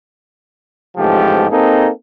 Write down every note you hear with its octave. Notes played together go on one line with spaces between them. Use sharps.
A1 G#2 C3 F3 A3 G4
A#3 C4 D#4 G#4 A4